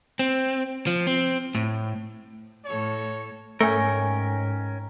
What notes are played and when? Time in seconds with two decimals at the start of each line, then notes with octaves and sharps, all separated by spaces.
0.19 C4
0.87 F3
1.07 C4
1.55 A2
2.65 A2 A4 C#5
3.61 G#2 A3 C#4 A#4 C#5 G5 G#5